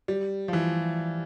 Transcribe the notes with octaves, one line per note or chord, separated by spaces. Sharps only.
G3
F3
E3